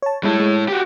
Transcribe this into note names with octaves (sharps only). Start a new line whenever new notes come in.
C#5 A5
A2 G3 G#3 E4
G#3
F#4 G4